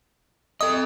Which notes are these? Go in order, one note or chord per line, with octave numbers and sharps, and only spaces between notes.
A4 D#5 D#6